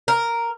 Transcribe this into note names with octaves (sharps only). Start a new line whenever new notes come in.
A#4